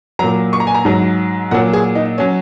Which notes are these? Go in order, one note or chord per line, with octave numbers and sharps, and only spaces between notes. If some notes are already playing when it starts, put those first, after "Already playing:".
A#2 F#3 A#5
C#6
A#5
G#5
A#5
G#2 F#3
A#2 F#3 F#5
G#4
D#4
F#3 C#4